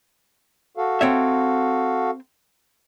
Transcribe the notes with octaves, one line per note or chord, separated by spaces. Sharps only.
F#4 A4 F5
C4 C#5 E5